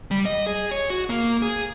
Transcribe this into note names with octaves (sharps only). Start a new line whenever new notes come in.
G3
D#5
G#4
C#5
F#4
A#3
G#4